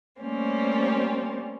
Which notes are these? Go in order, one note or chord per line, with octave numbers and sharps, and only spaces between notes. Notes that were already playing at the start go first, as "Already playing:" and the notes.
G3 A3 A#3 C4 C#4